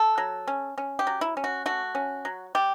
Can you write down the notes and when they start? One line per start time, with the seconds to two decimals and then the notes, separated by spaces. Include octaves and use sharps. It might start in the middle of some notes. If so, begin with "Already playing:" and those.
Already playing: A4
0.18 F#3
0.48 C#4
0.78 C#4
0.99 G4
1.07 F#3
1.21 E4
1.37 C#4
1.44 F#4
1.66 A3 F#4
1.95 C#4
2.25 F#3
2.55 G3 G4